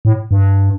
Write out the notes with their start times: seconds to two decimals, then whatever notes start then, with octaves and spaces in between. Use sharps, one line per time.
0.05 A2
0.31 G2